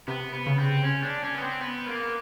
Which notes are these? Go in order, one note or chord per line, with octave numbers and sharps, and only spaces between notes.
C3 B3
B3
C#3
C4
C#4
D4
C#4
B3
C4
B3
A#3